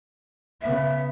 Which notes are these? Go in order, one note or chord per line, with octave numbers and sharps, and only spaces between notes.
C#3 B3 E5